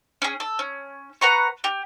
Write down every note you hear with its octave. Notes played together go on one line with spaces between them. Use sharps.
C#4 G#4
A4
C#4
B4 F#5 A#5 C#6
G4